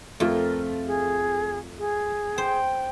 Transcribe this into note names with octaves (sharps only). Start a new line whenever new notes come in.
F2 A3 F4 A#4
G#4
G#4
C5 G5